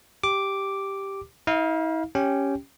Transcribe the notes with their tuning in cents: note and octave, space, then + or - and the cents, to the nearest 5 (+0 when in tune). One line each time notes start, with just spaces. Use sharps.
G4 +0 D6 +0
E4 -45 F5 +0
C#4 +0 G4 +0 G5 -5